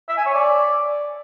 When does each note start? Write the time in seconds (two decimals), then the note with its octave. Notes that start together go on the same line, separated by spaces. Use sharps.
0.09 E5
0.17 G#5
0.26 C#5
0.34 D5